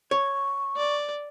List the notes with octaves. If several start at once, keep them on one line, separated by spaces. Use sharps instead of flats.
C#5 C#6
D5